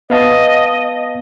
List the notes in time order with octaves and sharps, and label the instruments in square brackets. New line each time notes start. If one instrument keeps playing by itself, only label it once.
[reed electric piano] B3 F5 A5 [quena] D#5